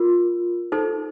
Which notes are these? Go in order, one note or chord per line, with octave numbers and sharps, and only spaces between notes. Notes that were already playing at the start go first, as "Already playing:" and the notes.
Already playing: F4 A#4
D#4 A4 C5